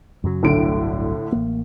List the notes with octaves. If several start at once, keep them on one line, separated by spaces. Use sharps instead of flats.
F#2 C#3 F#3
G1 C2 A2 D3 F#3 D7
A1 A#3